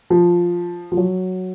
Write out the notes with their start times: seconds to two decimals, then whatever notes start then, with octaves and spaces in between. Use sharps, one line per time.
0.10 F3
0.92 F3
0.97 F#3